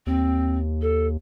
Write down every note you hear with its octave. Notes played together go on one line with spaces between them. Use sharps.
D#2 C4
A4